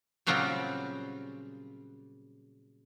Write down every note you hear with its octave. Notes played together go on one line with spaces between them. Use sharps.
A#2 C#3 F#3 G3 C4 F4